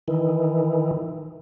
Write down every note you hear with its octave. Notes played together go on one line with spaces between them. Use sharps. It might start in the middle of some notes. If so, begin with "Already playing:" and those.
D#3 E3